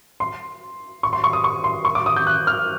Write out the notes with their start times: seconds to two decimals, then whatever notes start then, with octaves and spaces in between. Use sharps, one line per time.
0.20 C6
1.03 C#6
1.13 C6
1.24 C#6
1.33 D#6
1.44 C#6
1.64 C6
1.85 C#6
1.95 D6
2.06 D#6
2.16 G6
2.27 F#6
2.47 F6